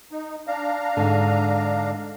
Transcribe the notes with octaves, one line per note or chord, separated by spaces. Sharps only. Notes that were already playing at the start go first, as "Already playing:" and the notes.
D#4
D4 F5 A#5
G#2 D3